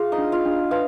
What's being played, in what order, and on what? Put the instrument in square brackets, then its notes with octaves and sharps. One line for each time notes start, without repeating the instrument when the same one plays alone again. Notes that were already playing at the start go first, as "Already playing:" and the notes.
Already playing: [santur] F4 F5 [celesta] G#4
[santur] D#4 D#5
[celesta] D4
[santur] F4 F5
[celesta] D4
[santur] F4 F5 [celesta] B4